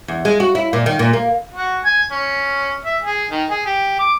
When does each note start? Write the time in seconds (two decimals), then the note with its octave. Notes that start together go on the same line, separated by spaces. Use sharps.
0.08 E2
0.25 G#3
0.40 F#4
0.55 E4
0.73 A#2
0.86 D#3
0.99 A#2
1.13 A#3
1.54 F#4
1.84 G#5
2.11 C#4
2.85 E5
3.02 G#4
3.31 D#3
3.50 G#4
3.66 G4
3.99 D6